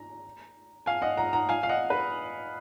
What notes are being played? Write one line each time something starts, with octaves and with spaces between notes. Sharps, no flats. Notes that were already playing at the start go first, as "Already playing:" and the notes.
Already playing: A#5
F5 G#5
D#5 F#5
F#5 A#5
F#5 A#5
F5 G#5
F5
D#5 F#5
B4